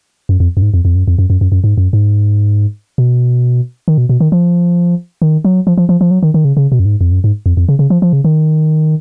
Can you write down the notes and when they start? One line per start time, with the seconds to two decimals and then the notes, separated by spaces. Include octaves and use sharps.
0.29 F#2
0.40 F2
0.57 F#2
0.62 G#2
0.74 F2
0.85 F2
0.95 F#2
1.08 F2
1.19 F#2
1.30 F#2
1.41 F#2
1.52 F#2
1.64 G#2
1.78 F#2
1.93 G#2
2.98 B2
3.88 D#3
3.98 B2
4.09 B2
4.20 D#3
4.32 F3
5.22 D#3
5.45 F#3
5.67 F3
5.78 F3
5.89 F3
6.01 F3
6.11 F#3
6.23 D#3
6.34 D#3
6.45 C#3
6.57 C#3
6.72 B2
6.79 F#2
6.85 G#2
7.01 F2
7.12 F#2
7.24 G#2
7.46 F2
7.57 F2
7.69 C#3
7.79 C#3
7.90 F3
8.02 F3
8.13 C#3
8.24 D#3